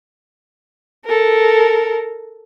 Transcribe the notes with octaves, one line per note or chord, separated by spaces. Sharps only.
A4 A#4